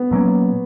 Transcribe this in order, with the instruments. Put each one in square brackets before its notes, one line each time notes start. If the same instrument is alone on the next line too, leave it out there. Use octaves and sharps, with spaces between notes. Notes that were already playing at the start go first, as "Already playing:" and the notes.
Already playing: [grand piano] B3
[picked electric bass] A#2 F#3 A#3 C#4